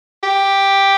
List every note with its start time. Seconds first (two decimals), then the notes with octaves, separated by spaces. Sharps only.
0.23 G4